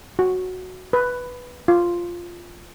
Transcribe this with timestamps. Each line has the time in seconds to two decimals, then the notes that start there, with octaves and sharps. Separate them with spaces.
0.19 F#4
0.93 B4
1.68 F4